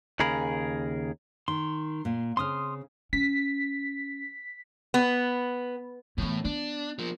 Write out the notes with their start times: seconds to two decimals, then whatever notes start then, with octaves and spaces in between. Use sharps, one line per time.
0.20 D#2 C#3 G#4 A#4 B5
1.48 D#3 C6
2.05 A#2
2.37 C#3 C4 C6 D#6 F6
3.13 C#4 B6
4.94 B3
6.18 A2 E3 B3
6.45 B3 D4
6.99 F3 A#3